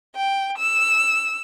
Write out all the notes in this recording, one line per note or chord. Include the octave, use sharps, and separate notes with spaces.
G5
E6